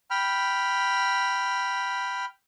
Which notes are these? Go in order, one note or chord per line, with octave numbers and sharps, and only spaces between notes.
G5 B5 F6